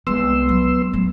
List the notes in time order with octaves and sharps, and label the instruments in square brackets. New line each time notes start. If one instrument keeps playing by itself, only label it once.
[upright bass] C2 G#3 [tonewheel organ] B3 C6 E6
[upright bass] F#3
F#3 A3